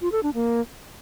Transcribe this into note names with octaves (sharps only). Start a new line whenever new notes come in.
F4
A4
D4
A#3